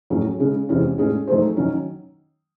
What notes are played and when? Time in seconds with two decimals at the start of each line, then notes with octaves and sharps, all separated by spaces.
0.10 A2 F#3 C#4 G#4
0.40 C#3 G#3 C#4
0.69 E2 C3 E3 G#3 C#4
0.98 A2 G#3 C#4 G#4
1.27 F#3 A3 D#4 G#4 C5
1.57 D#3 F#3 C#4